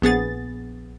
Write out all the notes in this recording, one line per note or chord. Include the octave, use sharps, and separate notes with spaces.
A#1 B3 G#4 A6